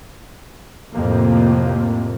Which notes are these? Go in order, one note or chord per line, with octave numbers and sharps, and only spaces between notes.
F2 A2 C3 A#3